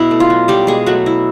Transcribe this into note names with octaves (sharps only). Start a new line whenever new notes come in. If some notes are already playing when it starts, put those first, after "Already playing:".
Already playing: B2 E4
A3
F4
F#3
B2 G3 G4
B2 G#3 G#4
F#3 A3 F#4
E4